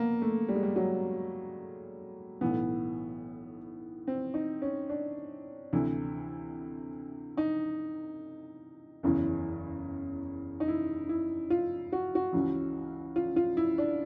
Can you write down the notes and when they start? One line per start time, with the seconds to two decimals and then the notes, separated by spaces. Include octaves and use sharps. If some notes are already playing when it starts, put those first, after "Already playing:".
Already playing: A#3 B3
0.22 A3
0.48 G3
0.55 G#3
0.63 G3
0.76 F#3
2.41 B1 A2 E3 B3
4.08 C4
4.34 D#4
4.62 C#4
4.89 D4
5.73 D2 C3 E3 E4
7.37 D#4
9.03 F#1 E2 C#3 E3
10.60 D#4
10.68 E4
11.09 E4
11.50 F4
11.92 F#4
12.15 F#4
12.33 C#2 C#3 E3
13.16 F4
13.36 F4
13.57 E4
13.78 D4